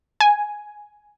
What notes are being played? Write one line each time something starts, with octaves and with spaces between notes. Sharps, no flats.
G#5